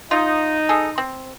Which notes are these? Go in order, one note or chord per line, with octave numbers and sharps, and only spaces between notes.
D#4 F4
G#4 A4
C4